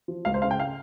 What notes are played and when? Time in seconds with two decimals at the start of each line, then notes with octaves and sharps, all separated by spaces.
0.08 F3
0.25 C#2 F5
0.34 C5
0.42 C#3 F5
0.51 G5
0.60 F5